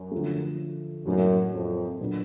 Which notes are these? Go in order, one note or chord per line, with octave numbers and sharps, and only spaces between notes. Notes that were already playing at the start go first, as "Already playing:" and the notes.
Already playing: F#2
D3 F3 A3
F#2 A2 F#3 A#3 D#4 F#4
F2
A#2 F#3 B3 D4